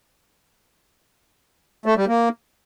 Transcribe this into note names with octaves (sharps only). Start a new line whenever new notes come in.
A3
G3
A#3